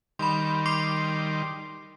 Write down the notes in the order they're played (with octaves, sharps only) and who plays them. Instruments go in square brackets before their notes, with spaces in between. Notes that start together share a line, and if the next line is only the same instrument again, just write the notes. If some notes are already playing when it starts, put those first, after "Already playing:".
[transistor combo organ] D#3 G3 [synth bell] B5 C6
[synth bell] C6 D6 C7